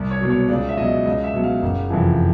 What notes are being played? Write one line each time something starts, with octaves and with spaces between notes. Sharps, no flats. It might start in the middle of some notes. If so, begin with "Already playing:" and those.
Already playing: C2
C#5
B2 F#3
C#5
C#2 D5
E5
B2 F#3 D#5
C#2 D#5
E5
B2 F#3
F5
F#1
F2 C3 E3